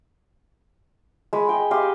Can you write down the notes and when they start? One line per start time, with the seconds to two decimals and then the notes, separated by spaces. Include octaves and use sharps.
1.33 G#3 B5
1.49 G#4 G5
1.71 G4 D#5 F5 C6